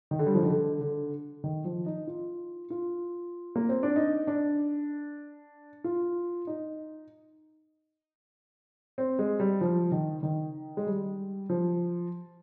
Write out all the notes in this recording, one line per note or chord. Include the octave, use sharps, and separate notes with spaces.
D#3
D3
G3
F3
D#3
D3
D3
D#3
F3
D#4
F4
F4
A#3
C4
D4
D#4
D4
F4
D#4
C4
G#3
G3
F3
D#3
D#3
G#3
G3
F3